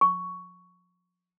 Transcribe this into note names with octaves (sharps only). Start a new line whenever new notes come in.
C#6